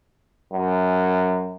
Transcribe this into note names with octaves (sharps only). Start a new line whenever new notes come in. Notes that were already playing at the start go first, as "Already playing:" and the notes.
F#2